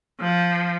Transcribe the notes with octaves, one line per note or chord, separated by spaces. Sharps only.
F3